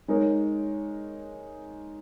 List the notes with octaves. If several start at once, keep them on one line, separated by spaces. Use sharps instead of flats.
G#3 D#4 A#4 C#5